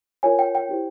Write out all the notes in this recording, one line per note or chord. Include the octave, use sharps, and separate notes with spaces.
F4 A#4 C#5 G#5
G5
G5
E4 G4 C5